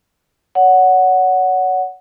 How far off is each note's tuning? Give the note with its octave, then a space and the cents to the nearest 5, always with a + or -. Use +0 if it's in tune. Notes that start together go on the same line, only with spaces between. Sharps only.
C#5 +30 F#5 +0